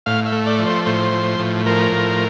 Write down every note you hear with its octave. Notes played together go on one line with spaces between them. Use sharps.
A2 F5
E5
A3
D5
F3
C5
A2 C5
F3
A2
F3 A#4
A2